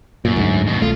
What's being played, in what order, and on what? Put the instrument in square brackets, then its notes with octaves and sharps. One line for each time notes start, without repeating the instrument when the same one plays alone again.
[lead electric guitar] F#2 [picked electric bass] A#2
[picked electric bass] D2 G#2
[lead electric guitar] D#2 B2
[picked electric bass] B1 A3 [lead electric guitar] F4